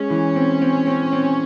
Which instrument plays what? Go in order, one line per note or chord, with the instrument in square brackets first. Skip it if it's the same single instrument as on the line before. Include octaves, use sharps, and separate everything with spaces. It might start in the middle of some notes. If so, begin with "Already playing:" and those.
Already playing: [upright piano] G#3 [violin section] C#4
[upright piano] E3
C4
C4
C4
C4